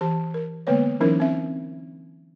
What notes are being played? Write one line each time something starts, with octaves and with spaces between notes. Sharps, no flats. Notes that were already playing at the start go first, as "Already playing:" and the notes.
E3 G4 A5
A#4
D3 G#3 A#3 B3 B4 C#5
E3 F#3 C#4 D#4 E4 A#4
C4 E5